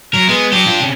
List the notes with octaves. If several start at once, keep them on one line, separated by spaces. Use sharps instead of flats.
F#3 A#4
G#3 B3
F#3 D4 G4
F4
C3 C#4